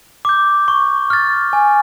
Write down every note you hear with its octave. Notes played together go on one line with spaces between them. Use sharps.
D6 G6
C#6
F6 A6
G#5